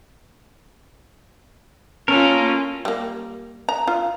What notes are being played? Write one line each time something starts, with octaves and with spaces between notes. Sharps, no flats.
A#3 C#4 F4 A4 A#4
G3 A#3
A#5
F4